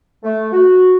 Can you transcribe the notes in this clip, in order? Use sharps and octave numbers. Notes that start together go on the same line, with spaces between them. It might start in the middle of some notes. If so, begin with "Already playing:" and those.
A3
F#4